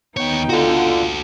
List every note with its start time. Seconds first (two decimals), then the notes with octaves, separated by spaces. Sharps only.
0.17 D#2 B3 D#4 C#5 G5
0.49 D3 F4 F#4 A4